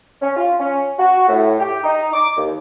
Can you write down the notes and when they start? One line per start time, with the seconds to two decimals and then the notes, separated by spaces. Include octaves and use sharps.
0.22 C#4
0.37 F4
0.60 C#4
0.99 F#4
1.29 A2
1.60 G4
1.84 D#4
2.13 D6
2.38 D#2